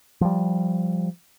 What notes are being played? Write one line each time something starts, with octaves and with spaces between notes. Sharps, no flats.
F3 G3